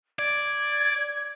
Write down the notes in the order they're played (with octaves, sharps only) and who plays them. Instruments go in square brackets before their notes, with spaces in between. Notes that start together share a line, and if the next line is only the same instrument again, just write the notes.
[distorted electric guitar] D5 [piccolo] G#6